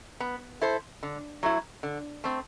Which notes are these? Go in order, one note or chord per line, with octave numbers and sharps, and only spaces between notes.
B3
E4 A4 C5
D3
F#3 A3 E4
D3
A3 C4